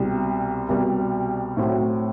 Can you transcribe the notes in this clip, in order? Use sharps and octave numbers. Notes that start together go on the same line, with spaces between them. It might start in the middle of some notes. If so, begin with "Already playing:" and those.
Already playing: C2 B2 G3
C2 B2 G3
A2 F#3 C4 F#4